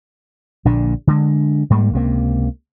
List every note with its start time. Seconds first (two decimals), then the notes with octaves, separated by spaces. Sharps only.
0.65 A#1 A#2 D3 D4
1.07 D3 G#3
1.70 G#2 G3 A#3
1.93 C#2 C3 A#3